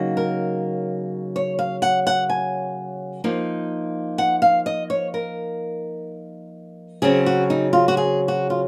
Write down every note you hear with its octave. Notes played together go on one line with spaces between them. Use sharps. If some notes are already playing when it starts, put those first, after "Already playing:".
Already playing: C#3 F#3 A#3 D#4
A#4
C#5
F5
F#5
F#5
G#5
F3 A#3 D#4
F#5
F5
D#5
C#5
A#4
C#3 F#3 C4 G#4
F#4
D#4
F4
F#4
G#4
F#4
F4